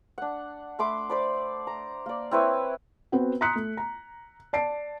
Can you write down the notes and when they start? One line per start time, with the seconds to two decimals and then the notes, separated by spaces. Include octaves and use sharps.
0.18 D4 F#5
0.79 A3 B5 C6 D6
1.10 C5 D5 B5
1.67 A#5
2.06 A#3 D5
2.31 C4 E4 B4 C#5
3.12 B3 C4 F#4 B4 F#5
3.41 A#5 C6 D#6 F#6 B6 C#7
3.55 A3
3.77 A#5
4.53 D5 A5 C7 D7